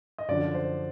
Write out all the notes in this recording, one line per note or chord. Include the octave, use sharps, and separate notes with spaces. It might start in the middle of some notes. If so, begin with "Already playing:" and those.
D#5
F#2 D3 F3 D5
C5